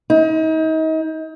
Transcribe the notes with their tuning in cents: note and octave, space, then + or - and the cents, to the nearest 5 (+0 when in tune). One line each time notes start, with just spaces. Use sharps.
D#4 +35